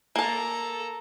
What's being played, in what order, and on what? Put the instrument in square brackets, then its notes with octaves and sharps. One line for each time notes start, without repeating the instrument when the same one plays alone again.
[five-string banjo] A#3 A5 [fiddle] A4 A#5